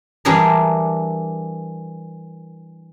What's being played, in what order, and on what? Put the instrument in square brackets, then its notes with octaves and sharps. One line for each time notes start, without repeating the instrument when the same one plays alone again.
[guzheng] E3 G3 D4 G#4 A#4